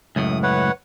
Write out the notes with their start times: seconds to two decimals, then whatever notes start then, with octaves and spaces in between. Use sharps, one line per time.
0.16 C#2 F#2 A2 D#6
0.43 B4 C#5 F#5